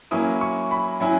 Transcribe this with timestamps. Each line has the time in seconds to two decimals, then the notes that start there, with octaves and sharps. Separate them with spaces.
0.11 F#3 A#3 C#4 E4 D#6
0.41 C#6
0.71 B5
1.00 F#3 C#4 E4 G#5